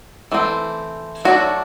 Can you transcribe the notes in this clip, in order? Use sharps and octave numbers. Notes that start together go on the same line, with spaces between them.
E3 A3 C4
F#3 A3 D4 F#4